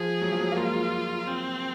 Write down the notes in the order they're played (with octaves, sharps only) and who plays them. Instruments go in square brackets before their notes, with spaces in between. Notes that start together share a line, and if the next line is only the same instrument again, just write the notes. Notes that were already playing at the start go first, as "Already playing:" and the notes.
Already playing: [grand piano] F3 [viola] G#4
[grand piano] F#3
F3
F#3
A#3
[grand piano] G#3 [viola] F4
[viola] C4